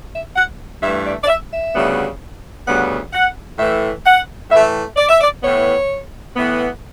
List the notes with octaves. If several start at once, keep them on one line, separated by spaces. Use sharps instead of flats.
E5
F#5
G2 E3 A3 E5
D5
D5
E5
E5
D2 C#3 G3 B3
D2 C#3 G3 B3 F#5
F#5
A2 E3 A3 E5
F#5
A2 E3 A3 E5
D5
E5
D5
A2 E3 B3 C#5
A2 E3 B3